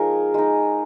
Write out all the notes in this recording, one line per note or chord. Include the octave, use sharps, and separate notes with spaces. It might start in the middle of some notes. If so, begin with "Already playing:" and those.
Already playing: F3 G#3 D#4 G#4 A#4
G#3 D#4